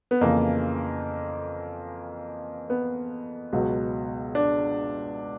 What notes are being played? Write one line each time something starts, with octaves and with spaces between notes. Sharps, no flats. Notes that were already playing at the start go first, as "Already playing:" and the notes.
B3
F2 C#3 E3 A#3
B3
C#2 B2 F#3
D4